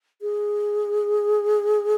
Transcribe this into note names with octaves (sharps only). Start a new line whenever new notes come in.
G#4